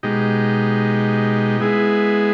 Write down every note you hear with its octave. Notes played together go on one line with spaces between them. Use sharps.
B2 G#3 D#4 G4
G#3 B3 E4 G#4